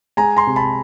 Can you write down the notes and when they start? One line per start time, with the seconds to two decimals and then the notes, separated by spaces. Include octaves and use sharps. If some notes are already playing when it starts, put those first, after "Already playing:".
0.17 G#3 G#5 A#5
0.37 A#5 C6
0.47 C3
0.56 A5 B5